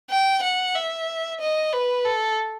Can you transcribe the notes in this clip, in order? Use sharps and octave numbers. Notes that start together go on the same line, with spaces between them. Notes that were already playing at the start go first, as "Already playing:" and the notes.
G5
F#5
E5
D#5
B4
A4